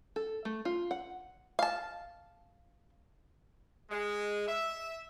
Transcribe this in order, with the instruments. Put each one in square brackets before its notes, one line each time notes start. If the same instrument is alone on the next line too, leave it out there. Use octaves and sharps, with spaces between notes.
[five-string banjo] A4
A3
F4
F#5
F5 A5
[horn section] G#3
E5